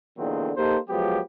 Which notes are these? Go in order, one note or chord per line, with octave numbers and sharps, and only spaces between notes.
E2 A#2 D3 D#3 F#3 C4
A#3 D#4 G4 A4 C5
F3 F#3 G#3 B3 G4